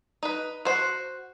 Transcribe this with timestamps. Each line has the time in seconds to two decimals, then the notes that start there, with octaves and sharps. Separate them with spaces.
0.23 D#4 B4
0.65 F#4 C5